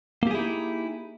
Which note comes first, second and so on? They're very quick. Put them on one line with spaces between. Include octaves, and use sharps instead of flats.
A#3 G4 G#4 E4 D#4